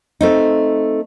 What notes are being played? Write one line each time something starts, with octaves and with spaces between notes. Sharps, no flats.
A3 C4 D#4